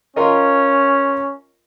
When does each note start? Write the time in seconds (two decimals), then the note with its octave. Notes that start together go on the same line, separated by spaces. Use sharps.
0.16 C#4 F4 A#4 D#5